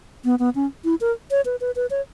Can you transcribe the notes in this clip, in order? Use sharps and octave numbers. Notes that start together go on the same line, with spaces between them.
B3
B3
C#4
E4
A#4
C#5
B4
B4
B4
C#5